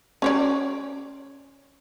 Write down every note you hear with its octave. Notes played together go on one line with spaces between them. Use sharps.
C#4 C#5 D5